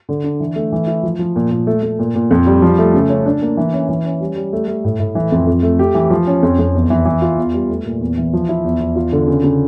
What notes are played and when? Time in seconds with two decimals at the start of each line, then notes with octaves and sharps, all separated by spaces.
0.09 D3
0.24 D4
0.40 E3
0.56 A3
0.72 E3
0.87 E4
1.03 F3
1.19 F3
1.36 A#2
1.51 A#2
1.67 A3
1.83 A3
1.99 A#2
2.15 A#2
2.31 F2
2.46 G3
2.62 F3
2.78 A3
2.94 C#3
3.09 C#4
3.26 D4
3.42 A#3
3.57 E3
3.73 C#4
3.89 E3
4.05 C#4
4.20 G3
4.36 G3
4.53 A3
4.68 A3
4.84 A2
4.99 A2
5.15 E3
5.32 F2
5.47 F2
5.63 A3
5.79 G4
5.94 E3
6.10 F3
6.27 C#4
6.43 F2
6.59 F2
6.75 E2
6.90 E3
7.05 E3
7.22 F4
7.37 E2
7.53 G3
7.70 A3
7.85 A#2
8.01 E2
8.18 E3
8.33 F3
8.49 E4
8.64 E2
8.80 E2
8.96 F4
9.12 D3
9.28 C#3
9.44 C#3